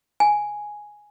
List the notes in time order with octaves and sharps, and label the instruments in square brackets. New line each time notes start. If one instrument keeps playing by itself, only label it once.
[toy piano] G#5